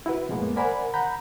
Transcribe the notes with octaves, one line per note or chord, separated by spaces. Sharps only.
E4 F#4 B4
F2 A2 G#3 A#3 B3
A#4 C5 D5 F#5 G#5 B5
F#5 A#5 B5 G6